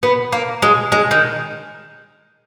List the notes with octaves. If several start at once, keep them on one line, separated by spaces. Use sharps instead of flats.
B3
A#3
G#3
G#3
D#3